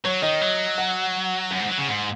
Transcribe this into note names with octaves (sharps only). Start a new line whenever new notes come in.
F#3 C#5
D#3 D#5
F#3
F#5
F#2 F#5
G#2
F#3
C#3
G#2